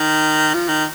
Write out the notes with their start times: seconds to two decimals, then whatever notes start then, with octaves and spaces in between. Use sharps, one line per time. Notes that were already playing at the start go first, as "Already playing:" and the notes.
Already playing: D#3
0.54 F3
0.69 D#3